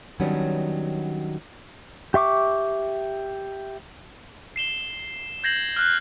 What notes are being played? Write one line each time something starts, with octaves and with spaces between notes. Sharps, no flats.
D#3 F#3 G3 B3 C#4 D4
G4 E5 C#6 D6
C7 E7 G7
G6 G#6 A#6 C7 F#7
F6 F#6